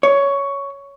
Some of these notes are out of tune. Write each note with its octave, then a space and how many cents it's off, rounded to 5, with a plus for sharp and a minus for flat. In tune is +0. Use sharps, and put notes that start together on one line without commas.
C#5 +10